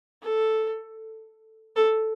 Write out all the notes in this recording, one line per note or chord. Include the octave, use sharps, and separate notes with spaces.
A4
A4